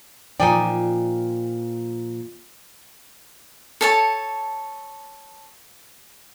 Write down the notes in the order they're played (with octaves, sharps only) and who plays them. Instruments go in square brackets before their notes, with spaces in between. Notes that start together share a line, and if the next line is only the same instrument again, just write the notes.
[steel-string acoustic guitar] A#2 F3 [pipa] D#4 D5 [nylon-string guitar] G5 G#5
[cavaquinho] A4 C#5 A5